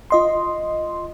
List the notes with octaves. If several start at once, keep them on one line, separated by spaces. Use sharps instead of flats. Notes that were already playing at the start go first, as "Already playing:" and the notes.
F4 D#5 C6